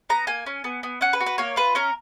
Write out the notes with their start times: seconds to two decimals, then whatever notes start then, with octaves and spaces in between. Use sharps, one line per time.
0.10 B3 A#5
0.27 A#3 G#5
0.46 C#4
0.64 B3
0.83 B3
1.01 C#4 F#5
1.13 B4
1.20 F#4
1.26 B4
1.38 A#3 C#5
1.56 F4 B4
1.75 C#4 A#4